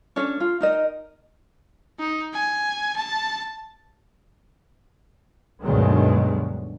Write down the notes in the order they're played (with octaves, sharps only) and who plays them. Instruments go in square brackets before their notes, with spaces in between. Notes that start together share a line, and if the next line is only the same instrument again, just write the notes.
[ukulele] C#4 D4 A4 C#5
F4
D#4 A#4 D#5
[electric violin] D#4
G#5
A5
[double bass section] D2 G2 B2 D#3 F#3 G#3